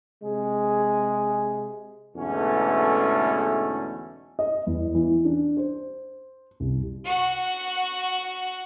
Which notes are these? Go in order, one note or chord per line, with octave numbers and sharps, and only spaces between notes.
C3 G#3 G#4
E2 G#2 B2 D3 A3 C#4
D#5
E2
E3
D4
C5
C2
F#4 F#5